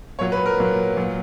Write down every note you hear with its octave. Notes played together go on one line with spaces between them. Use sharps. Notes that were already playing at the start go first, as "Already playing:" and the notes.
A#2 F#3 C#5
B4
A#4
A#2 F#3
A#2 F#3